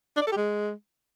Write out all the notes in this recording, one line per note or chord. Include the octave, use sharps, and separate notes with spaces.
D4
D5
A4
G4
G#3